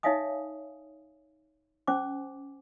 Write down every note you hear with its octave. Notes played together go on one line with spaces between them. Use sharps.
D#4 C#5 E5 F5 G#5 D#6
C#4 C5 G#5 D6